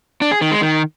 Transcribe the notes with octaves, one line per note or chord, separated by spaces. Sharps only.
D4
G#4
D#3
G#3
D#3